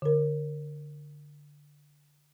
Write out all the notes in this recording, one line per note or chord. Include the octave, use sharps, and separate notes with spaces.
D3 A#4